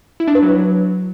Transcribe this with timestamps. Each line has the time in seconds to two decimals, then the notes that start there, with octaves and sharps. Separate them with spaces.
0.20 E4
0.28 D4
0.35 B4
0.43 F#3